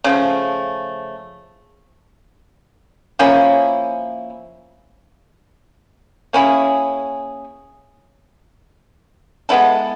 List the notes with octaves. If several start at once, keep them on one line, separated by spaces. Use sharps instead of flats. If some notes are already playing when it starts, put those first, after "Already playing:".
C#3 F3 A3
F3 A#3 C#4 E4
A#3 C#4 E4 G#4
G#3 B3 E4 A4